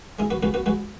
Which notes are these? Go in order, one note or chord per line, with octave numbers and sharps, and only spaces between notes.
G#3 E4 G#4
F#4 B4
C#2 F#4 B4
F#4 B4
G#3 F#4 B4